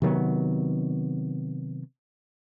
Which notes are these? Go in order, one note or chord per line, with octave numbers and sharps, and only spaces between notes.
C3 D#3 F#3 B3